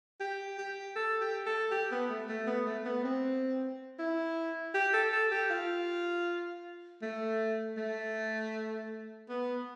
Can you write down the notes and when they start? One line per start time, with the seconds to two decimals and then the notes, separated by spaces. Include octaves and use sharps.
0.20 G4
0.58 G4
0.96 A4
1.21 G4
1.46 A4
1.71 G4
1.91 B3
2.10 A3
2.29 A3
2.47 B3
2.66 A3
2.86 B3
3.04 C4
3.99 E4
4.75 G4
4.94 A4
5.13 A4
5.31 G4
5.50 F4
7.02 A3
7.77 A3
9.29 B3